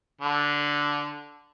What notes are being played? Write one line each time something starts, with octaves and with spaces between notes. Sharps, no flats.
D3